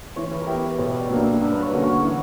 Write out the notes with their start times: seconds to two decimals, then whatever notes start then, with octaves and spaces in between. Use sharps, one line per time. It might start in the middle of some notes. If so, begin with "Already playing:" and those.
0.16 E3 C#5
0.31 B4
0.42 A#4
0.47 B3 E4 G4
0.63 B4
0.78 B2 C#5
1.00 D5
1.09 F#3 A#3 D4
1.20 E5
1.33 F#5
1.41 G2 E5
1.52 B4
1.62 C#5
1.72 D3 A#3 C#4 F#4
1.83 C#5
2.03 E3